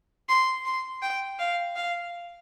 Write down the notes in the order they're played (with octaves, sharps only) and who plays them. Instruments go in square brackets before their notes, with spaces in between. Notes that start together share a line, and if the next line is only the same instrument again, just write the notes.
[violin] C6
C6
G5
F5
F5